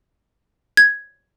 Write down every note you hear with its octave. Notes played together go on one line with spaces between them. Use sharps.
G#6